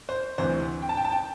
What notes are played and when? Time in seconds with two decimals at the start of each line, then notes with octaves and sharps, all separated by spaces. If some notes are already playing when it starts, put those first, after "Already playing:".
0.09 C5
0.38 D2 C3 E3 C5
0.82 G5
0.89 A5
0.97 G5
1.05 A5
1.12 G5